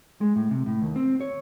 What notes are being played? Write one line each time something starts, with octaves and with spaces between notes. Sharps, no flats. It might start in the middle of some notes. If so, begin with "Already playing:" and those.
G#3
A2
C3
A2
D#2
C4
C#5